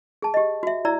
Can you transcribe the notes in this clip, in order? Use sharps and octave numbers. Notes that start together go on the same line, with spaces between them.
G#4 A5
G4 D#5
F#4 E5
E4 D5 A#5 E6